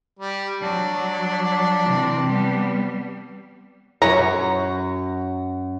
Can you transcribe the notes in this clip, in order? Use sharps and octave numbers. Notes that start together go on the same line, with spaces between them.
G3
F#3 D4
C3 E3
G3 B3
F#2 C#5 A#5